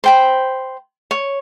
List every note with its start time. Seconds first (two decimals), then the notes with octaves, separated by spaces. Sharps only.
0.04 C5 G5 B5
1.11 C#5